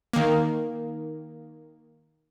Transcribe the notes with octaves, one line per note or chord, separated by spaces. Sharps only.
D#3 A#3